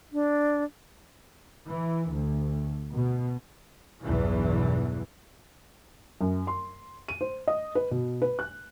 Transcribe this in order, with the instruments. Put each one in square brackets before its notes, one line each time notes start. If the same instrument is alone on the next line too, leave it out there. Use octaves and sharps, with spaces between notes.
[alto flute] D4
[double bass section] E3
D2
B2
B1 E2 G2 E3
[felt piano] F#2
C6
D#7
C5
D#5
B4
B2
B4
F#6